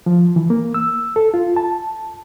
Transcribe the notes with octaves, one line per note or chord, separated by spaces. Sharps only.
F3
E3
A#3
E6
A4
F4
A5